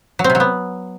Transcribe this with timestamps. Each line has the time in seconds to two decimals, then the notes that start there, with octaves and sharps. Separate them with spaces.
0.19 F#3
0.24 C4
0.30 C3
0.35 F#3
0.40 B3